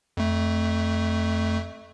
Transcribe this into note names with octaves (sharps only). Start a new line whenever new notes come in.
F2 A3